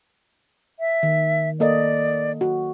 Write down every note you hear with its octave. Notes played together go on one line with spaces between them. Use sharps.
E5
D#3
A#3 A4 D5 D#5
F#4